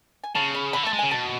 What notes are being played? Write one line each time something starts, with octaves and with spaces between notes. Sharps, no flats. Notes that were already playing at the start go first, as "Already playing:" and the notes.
G#5
C#3 A5
B5
D3 B5
A3 A5
G#3
C#3 G#5
B2 A5